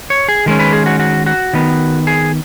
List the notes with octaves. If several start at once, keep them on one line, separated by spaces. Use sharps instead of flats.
C#5
G#4
D#3 G#3 C#4
B4
G#4
F#4
F#4
F#4
D#3 B3
G#4